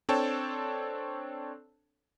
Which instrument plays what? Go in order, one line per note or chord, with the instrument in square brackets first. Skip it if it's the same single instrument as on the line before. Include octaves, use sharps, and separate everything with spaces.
[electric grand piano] C4 D4 A4 C#5 G5 A5